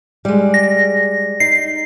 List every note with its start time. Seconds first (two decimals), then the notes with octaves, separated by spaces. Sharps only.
0.25 G3 G#3
0.54 A#6
1.40 D#4 C7